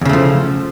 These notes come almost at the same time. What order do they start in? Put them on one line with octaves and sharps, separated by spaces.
E2 C#3 A3 F3